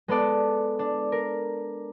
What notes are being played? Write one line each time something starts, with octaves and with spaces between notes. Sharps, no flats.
G#3 B3 A4 D5
D4
A#4